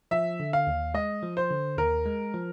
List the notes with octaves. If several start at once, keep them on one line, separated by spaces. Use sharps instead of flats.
F3 E5
D3
F5
D#2
G#3 D#5
F3
C5
D3
D#2 A#4
G#3
F3